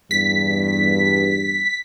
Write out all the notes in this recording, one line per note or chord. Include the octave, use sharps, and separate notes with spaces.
E2 G2 B6